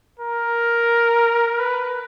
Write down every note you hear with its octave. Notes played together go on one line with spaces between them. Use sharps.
A#4
B4